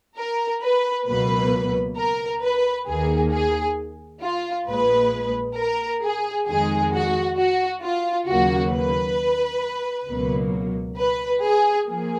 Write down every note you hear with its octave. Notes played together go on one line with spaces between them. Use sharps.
A#4
B4
C#2 B2 F#3 A#3 B4
A#4
B4
D#2 D#3 A#3 G#4
G#4
F4
A#1 A#2 G#3 B4
A#4
G#4
F2 D#3 G#3 G#4
F#4
F#4
F4
D#2 C#3 F#3 A#3 F#4
B4
C#2 B2 F#3 A#3
B4
G#4
F3 A#3 G#4